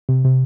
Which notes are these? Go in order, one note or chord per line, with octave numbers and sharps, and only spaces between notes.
C3
C3